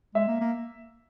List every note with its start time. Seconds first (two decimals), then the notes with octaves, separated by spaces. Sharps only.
0.15 G#3 E5
0.28 A#3
0.41 A#3